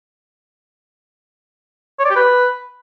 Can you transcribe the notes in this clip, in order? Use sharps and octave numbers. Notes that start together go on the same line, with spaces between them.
C#5
D5
G4
B4